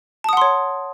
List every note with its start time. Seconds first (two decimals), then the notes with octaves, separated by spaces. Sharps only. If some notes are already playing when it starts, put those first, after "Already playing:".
0.24 A5
0.29 D#6
0.33 F#5
0.37 C6
0.42 C#5